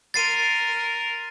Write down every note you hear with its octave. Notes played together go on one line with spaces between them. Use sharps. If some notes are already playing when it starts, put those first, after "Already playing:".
A#4 C6 A6 C7 D#7